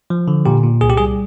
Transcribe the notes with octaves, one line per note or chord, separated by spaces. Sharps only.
F3
D3
A#2 G4
A#2
C2 G#4
G4
G3 G#4